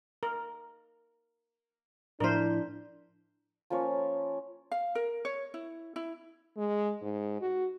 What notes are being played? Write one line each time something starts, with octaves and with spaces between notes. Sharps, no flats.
A#4
A2 F3 D4 E4 A#4 C5
F3 A#3 C#4 C#5
F5
A#4
C#5
E4
E4
G#3
G#2
F#4